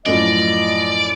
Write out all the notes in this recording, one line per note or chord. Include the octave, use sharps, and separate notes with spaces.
F#2 A2 F3 D5 D#5